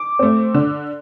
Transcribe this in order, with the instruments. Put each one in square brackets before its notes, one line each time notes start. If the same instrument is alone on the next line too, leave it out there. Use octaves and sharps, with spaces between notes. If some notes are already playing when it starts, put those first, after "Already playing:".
Already playing: [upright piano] D6
[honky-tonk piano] A3 C4
D3